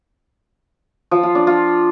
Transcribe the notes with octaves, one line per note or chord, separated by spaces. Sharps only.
F3
F4
D4
F4